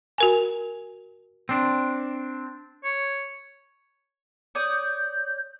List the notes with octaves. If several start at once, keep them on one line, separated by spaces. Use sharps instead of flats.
F#4 A#4 G#5
C4 D4
C#5
C#5 D5 D#6 G6